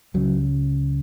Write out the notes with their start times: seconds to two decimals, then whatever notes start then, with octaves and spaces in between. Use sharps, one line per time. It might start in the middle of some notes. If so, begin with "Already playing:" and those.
0.14 C#2 C#3 F#3